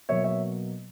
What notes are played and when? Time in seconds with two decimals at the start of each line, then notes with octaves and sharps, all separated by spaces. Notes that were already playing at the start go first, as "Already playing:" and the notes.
0.09 B2 F#3 A#3 C#5 E5
0.24 C#5 E5